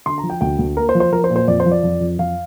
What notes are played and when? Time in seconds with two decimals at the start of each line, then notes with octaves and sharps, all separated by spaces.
0.06 D3 C6
0.18 A#5
0.23 F3
0.30 G5
0.41 D2 G5
0.59 D2
0.77 A#3 A#4
0.89 C5
0.95 F3
1.00 C5
1.12 F3 A#4
1.24 C5
1.30 A#2
1.36 C5
1.48 F2 D5
1.60 C5
1.66 F3
1.72 D5
1.83 F2
2.01 F2
2.19 F2 F5